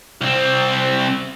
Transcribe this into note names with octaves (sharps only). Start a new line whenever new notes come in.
C2 C4